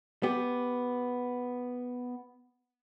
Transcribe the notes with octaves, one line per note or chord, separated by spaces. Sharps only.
B3 G4